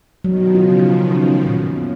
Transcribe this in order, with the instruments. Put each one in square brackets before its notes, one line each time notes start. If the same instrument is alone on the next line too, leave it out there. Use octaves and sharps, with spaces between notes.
[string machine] B2 D#3 [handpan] F#3
[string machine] C#3 F3 [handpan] F4
[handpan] F#3
C#4
[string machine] F#2 [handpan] A#2
[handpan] B3